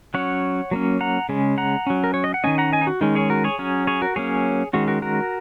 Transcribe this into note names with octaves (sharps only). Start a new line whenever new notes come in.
F#3 C#4 C#5 F#5
F#3 A#3 C#4
F#5 A#5
C#3 G#3 C#4
F#5 A#5
F#3 C#4
A#4
C#5
D#5
F#5
D#3 A#3 C#4 D#5 G#5
F#5 A#5
D#5 G#5
D#4
F#4
D#3 G#3 C#4 D#4
G#4 C#5
F#4 A#4
G#4 C#5
F#3 C#4
G#4 C#5
F#4 A#4
F#3 A#3 C#4 G#4 C#5
D#3 G#3 C#4 F#4
F#4 A#4
F#4 A#4